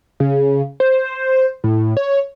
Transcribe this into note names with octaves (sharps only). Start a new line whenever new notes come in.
C#3
C5
A2
C#5